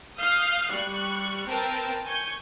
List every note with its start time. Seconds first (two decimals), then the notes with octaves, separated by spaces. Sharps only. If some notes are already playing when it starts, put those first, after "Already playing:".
0.19 F5 D#6 G6
0.71 G3 C#6 F#6
1.47 C4 A#4 B4 G5 A5
2.06 G#5 C#6 G6